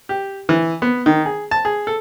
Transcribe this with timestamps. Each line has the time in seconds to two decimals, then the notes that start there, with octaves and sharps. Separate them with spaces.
0.09 G4
0.49 E3
0.82 B3
1.06 D#3
1.26 G#4
1.51 A5
1.65 G#4
1.87 A4